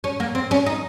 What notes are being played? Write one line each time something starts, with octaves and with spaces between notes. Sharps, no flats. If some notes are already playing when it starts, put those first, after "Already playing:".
C#4
A#3
C4
C#4
D#4